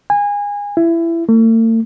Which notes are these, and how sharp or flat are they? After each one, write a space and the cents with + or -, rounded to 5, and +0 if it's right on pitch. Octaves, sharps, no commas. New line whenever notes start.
G#5 -25
E4 +20
A3 +45